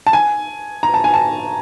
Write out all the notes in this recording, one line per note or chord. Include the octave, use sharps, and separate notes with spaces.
A5
G#5
A#5
A5
G#5
A5